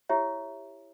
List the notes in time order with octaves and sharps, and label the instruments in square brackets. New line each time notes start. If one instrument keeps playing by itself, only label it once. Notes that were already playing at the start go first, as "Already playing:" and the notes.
[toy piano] E4 G4 C#5 E5